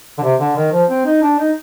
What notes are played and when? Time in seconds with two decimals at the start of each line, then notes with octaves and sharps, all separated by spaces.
0.18 D3
0.23 C3
0.40 D3
0.56 D#3
0.72 F3
0.89 C4
1.06 D#4
1.22 D4
1.39 D#4